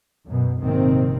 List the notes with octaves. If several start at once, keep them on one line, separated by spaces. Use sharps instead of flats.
F#2 B2
A#1 G#2 C3 D#3 C4